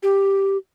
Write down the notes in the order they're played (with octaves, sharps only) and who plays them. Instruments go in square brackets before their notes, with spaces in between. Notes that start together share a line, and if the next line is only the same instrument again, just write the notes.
[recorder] G4